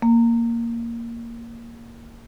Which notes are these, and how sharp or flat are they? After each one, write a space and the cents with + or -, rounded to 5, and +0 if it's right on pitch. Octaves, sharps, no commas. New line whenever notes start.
A#3 -5